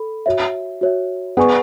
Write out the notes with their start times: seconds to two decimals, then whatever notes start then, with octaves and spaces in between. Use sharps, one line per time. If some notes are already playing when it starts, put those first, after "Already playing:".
Already playing: A4 B5
0.26 F#4 C#5 E5
0.81 F#4 C#5 E5
1.37 B3 G#4 D5 G#5 C#6